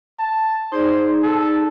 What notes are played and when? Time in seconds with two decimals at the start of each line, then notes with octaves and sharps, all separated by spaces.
0.19 A5
0.72 D#4 G#4 C5 D5
1.23 A4